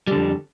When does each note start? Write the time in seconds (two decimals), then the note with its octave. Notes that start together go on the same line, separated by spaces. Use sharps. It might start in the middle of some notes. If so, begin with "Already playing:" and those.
0.07 G3
0.11 D3
0.15 F2